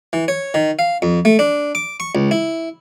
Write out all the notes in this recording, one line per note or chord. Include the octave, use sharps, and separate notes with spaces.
E3
C#5
D#3
F5
F2
A3
D4
D6
C#6
C#2
E4